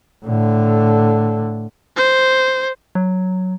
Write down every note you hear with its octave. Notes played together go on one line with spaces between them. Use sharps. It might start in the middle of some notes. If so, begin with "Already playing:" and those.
A2 D3
C5
F#3